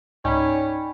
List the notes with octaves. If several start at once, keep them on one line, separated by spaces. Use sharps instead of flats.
C#2 G#2 C#4 D#4 D5 G5 G#5 B5